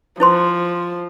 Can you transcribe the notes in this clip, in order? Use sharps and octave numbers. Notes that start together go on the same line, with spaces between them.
F3 E4 C5 C6